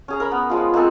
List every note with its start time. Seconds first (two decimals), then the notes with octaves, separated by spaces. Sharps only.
0.08 C#4 G#4 A#5
0.20 A#4 B5
0.32 B3
0.50 F3 G#3 F4
0.74 G#3 A#3 C4 A4